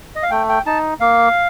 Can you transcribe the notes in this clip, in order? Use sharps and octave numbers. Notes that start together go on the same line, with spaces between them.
D#5
F5
A3 G5
G5
D#4 A5
A#3 F5